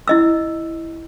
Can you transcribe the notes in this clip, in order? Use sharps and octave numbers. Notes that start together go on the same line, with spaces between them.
E4 D#5 E6